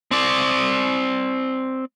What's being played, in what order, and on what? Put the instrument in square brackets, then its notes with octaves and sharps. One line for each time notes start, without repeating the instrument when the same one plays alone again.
[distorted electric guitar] C4 D5